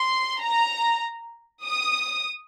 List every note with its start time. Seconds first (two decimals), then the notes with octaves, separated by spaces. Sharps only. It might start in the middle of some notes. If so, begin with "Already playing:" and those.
Already playing: C6
0.41 A#5
1.64 D#6